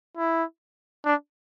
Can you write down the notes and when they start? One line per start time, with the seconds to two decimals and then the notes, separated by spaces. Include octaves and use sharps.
0.17 E4
1.05 D4